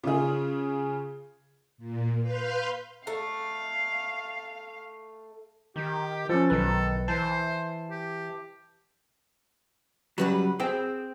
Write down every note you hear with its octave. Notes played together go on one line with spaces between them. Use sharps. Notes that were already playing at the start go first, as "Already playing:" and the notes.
C#3 F4 G#4
A#2
B4 F5 C6 F6 G6
A3 F5
D#3 G4
F3 C#4 A4
B1 D#3 A4 B4
E3 C5 A5
G4
G2 C#3 F#3 G3 B4 F#5
C4 G#4 G5